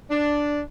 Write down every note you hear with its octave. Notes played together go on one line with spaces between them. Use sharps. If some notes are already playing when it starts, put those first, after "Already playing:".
D4